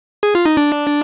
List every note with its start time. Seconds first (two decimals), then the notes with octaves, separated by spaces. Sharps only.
0.23 G#4
0.35 F4
0.46 D#4
0.57 D4